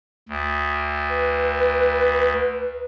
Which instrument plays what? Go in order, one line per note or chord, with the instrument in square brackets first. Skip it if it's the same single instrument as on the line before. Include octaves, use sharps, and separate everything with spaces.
[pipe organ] D2
[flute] B4